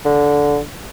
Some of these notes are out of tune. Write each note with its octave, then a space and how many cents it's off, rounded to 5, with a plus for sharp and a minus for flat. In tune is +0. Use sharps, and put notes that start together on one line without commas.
D3 -10